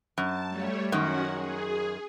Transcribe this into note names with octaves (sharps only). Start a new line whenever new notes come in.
F#2 A5
G3 A3 C#5
F#2 D#3 C#4 F#4 F#5
G#4